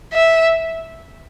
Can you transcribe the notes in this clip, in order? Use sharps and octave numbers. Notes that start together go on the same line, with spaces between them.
E5